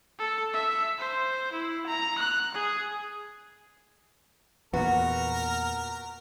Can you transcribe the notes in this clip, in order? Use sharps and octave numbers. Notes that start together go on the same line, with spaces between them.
A4
E5
C5
E4
A#5
F#6
G#4
E2 A#2 B3 F#4 A#4